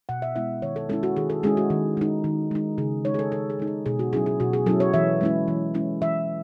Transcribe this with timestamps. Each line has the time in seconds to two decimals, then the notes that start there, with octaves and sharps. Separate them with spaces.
0.09 B2 F#5
0.22 E5
0.36 G#3 B3 E4 E5
0.62 D#3 C#5
0.76 A4
0.89 G#3 C#4 E4 A4
1.03 F#4
1.16 D#3 G#4
1.30 A4
1.43 G#3 C#4 E4 G#4
1.57 F#4
1.70 D#3
1.97 G#3 D#4
2.24 D#3
2.51 G#3 D#4
2.78 C#3 G#4
3.05 G#3 D#4 C#5
3.14 G#4
3.19 A4
3.32 C#3 A4
3.50 G#4
3.59 G#3 D#4
3.67 G#4
3.86 B2 G#4
3.99 F#4
4.13 F#3 C#4 E4 G#4
4.26 G#4
4.40 B2 F#4
4.53 G#4
4.66 F#3 C#4 E4 A4
4.80 C#5
4.94 E3 E5
5.21 G#3 C#4 E4
5.48 E3
5.74 G#3 C#4 E4
6.02 E3 E5